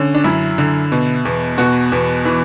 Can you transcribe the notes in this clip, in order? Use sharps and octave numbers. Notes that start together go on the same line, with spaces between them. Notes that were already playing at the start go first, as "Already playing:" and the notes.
Already playing: D3 C#4
D4
F#2 E4
D3
B2
E2
B2 F#4
E2
E3